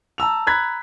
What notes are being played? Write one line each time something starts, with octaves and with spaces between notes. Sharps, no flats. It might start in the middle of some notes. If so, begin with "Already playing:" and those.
A5 A#5 E6 F7
A#5 B5 F#6 G#6 B6